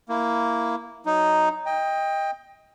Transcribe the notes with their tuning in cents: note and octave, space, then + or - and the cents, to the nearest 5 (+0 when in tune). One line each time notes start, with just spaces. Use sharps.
A#3 +0 E4 +0
F#3 +10 D#4 +0
D#5 +10 G5 +20